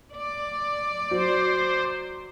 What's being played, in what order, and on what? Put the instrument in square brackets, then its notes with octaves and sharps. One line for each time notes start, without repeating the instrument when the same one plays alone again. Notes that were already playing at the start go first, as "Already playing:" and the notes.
[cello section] D5
[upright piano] F#3 [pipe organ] C5